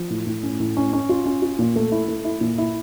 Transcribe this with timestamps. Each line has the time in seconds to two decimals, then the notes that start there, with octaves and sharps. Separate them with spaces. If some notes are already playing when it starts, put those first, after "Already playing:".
Already playing: F3
0.10 A2
0.27 A2
0.43 C#4
0.60 A2
0.77 C#4
0.93 C#4
1.09 F4
1.26 C#4
1.42 F4
1.59 A#2
1.76 A3
1.92 E4
2.08 A3
2.25 E4
2.41 A#2
2.58 E4